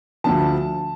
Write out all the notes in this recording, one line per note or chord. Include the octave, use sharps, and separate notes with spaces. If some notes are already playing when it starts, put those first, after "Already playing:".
D2 D3 F3 A5